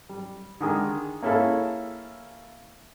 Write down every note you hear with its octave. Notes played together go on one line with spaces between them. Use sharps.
G3
D3 D#3 G#3
A#3 C#4 E4 G#4 A4